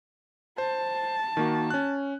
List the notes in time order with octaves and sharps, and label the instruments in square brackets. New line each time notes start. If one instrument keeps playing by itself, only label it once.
[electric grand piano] C5 [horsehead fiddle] A5
[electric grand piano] D#3 A#3 F#4
C#4 F#6